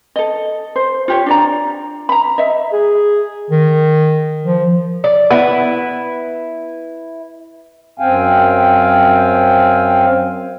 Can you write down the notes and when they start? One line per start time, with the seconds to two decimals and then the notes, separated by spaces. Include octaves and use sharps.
0.16 A4 D#5
0.76 C5
1.08 F4 G4 C#5
1.26 D4 D5 A#5
2.09 A#5 B5
2.38 D#5 E5
2.73 G#4
3.51 D#3
4.46 F3
5.04 D5
5.30 B3 E4 B4
8.00 F#2 C4 F5 G5 G#5